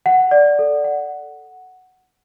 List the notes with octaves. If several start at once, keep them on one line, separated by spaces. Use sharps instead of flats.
F#5
D5
A4
F#5